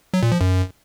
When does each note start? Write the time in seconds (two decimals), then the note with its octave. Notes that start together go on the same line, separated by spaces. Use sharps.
0.14 F#3
0.23 A#2
0.32 F3
0.41 F#2